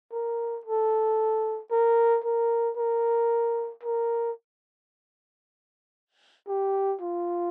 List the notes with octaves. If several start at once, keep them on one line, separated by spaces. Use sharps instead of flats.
A#4
A4
A#4
A#4
A#4
A#4
G4
F4